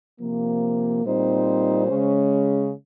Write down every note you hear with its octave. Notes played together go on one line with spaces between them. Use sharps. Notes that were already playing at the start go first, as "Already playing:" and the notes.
C3 F3 A#3
A#2 G3 C4 D#4 C5
C#3 G#3 C#4